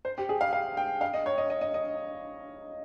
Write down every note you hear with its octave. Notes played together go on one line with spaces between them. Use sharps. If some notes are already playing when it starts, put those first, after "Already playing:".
C5
G4
G#4
F5
F5
G5
F5
D#5
C#5
D#5
D#5
D#5
D#5